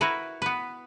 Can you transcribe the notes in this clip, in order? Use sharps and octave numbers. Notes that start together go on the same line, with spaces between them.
E4 F#4 A#4 B4 E5
B3 B4